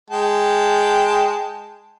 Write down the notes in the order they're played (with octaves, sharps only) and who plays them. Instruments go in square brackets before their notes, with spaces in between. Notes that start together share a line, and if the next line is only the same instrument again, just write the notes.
[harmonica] G#3 G5 A5